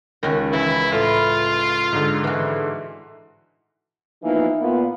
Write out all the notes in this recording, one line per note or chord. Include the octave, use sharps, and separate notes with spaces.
C#2 D#3 C#4 F#4
E3 E4
A2 E4 F4
G#2 D3
E3 F#4
E3 F3 A#3 B3 D#4
A#2 B3 F4